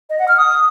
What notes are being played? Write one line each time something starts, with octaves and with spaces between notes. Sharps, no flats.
D#5
F#5
F6
D#6